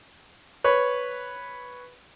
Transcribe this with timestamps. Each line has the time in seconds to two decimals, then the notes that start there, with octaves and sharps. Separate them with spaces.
0.64 B4 C#5